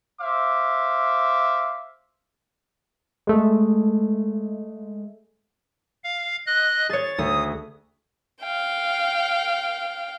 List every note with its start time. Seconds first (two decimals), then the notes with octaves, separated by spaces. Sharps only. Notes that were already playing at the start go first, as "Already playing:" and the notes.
0.21 C5 E5 F5 D6
3.27 G#3 A3
6.04 F5
6.46 D#5 F#6
6.89 G#4 C#5 A6
7.18 D2 D#6
8.42 F5 G5